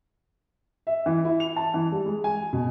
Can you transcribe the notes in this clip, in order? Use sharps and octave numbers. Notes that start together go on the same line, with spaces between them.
E5
E3
E4
F7
A5
E3
G3
G#3
G#5
B2